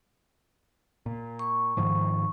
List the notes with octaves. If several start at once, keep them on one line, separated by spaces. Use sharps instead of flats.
A#2
C#6
G#2 D#3 F3